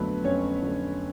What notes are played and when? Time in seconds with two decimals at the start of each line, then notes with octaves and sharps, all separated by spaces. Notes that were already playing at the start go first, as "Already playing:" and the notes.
Already playing: F2 D3 F#3 A3 B3 B4
0.24 F2 C#4 C#5
0.62 D3 F#3 A3